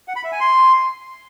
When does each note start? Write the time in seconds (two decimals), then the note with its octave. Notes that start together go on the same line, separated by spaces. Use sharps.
0.08 F#5
0.16 B5
0.24 E5
0.32 G#5
0.40 C6